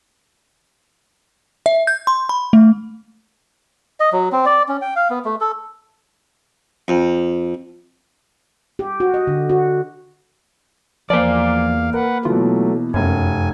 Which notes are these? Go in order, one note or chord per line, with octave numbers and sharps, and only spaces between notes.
E5
G6
C6
B5
A3
D#5
F#3
C4
D5
C#4
G5
F5
B3
A3
A4
F2
G4
F#4
D#5
D3
F#4
E2 F3 A#3 D5 F5
A#4 B4 F#5
B2 E3 F#3 A3 F4
F1 F#2 C#4 G#5